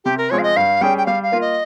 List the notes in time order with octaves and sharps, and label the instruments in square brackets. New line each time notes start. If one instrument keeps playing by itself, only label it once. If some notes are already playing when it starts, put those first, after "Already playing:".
[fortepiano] C3 [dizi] G4
[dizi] A#4
[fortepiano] F3 G#3 C4 [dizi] C#5
[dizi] F5
D#5
[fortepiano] G2 [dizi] F5
[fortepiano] G3 C#4 G#4 [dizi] G5
[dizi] G5
[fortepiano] G3 [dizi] F5
[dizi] F5
[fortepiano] A#3 F4
[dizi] D#5